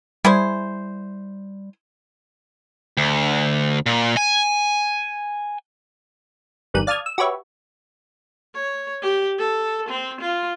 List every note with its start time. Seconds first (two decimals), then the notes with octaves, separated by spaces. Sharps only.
0.25 G3 E4 G#4 C5
2.97 D2
3.86 A#2
4.17 G#5
6.74 G1 E2 D#3 G3 F#6 D#7
6.87 D5 F5 A5 D#6 F6 G#6
7.06 E6
7.18 F#4 G4 B4 C#5 E5
8.55 C#5
9.02 G4
9.39 A4
9.89 C4
10.21 F4